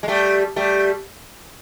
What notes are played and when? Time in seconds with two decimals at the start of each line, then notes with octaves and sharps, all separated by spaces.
0.03 G#3
0.08 G3 A3
0.56 G3 A3